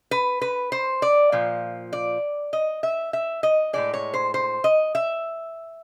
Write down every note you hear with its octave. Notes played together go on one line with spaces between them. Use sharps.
B4
B4
C5
D5
A#2 F3
D5
D#5
E5
E5
D#5
A2 F3 G#3 D5
C#5
C5
C5
D#5
E5